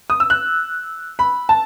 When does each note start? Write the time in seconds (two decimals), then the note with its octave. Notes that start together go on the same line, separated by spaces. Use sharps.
0.10 D#6
0.20 E6
0.30 F#6
1.19 B5
1.49 A5